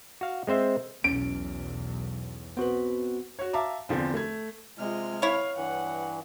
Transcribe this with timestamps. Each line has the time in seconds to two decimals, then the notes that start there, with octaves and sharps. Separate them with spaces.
0.21 F#4 F5
0.47 G#3 C4 C5 E5
1.04 B1 E2 C#4 D7
2.57 B3 C4 F#4 B4
3.39 F#4 C#5
3.53 E5 F5 A5 A#5 D6
3.89 E2 D3 F3 C4
4.14 A3 G#6
4.79 C3 G#3 F4 F6
5.22 E4 C#5 F5
5.57 G2 E3 F#5